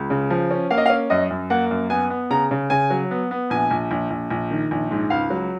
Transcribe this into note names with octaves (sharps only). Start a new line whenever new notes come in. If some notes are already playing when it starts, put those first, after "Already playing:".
Already playing: C#2
C#3
F3
C#4
A#3 F5
D#5
F5
C#4
F#2 D#5
F#2
A#3 F#5
F#2
B3 G#5
B3
C#3 A#5
C#3
C#3 G#5
F#3
B3
B3
A#1 G#5
A#1
A#1
A#1
A#1
D#3
A#1
G#2
C#2 F5
F#3